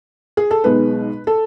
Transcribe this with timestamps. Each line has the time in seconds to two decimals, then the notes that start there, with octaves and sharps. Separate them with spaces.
0.37 G#4
0.51 A4
0.64 B1 B2 G#3 D#4 B4
1.27 A4